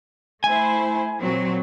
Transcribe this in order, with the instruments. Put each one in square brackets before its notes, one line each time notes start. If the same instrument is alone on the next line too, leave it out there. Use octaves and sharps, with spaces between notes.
[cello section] A3 E4 C5 [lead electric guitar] G#5
[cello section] A#2 F#3 C4